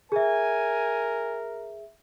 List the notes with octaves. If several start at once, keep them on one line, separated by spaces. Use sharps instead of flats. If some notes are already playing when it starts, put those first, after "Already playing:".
G#4 A#4 E5 G#5